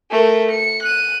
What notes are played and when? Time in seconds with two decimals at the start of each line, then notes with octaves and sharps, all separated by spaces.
0.11 A3 A#4
0.51 C#7
0.83 F#6 D#7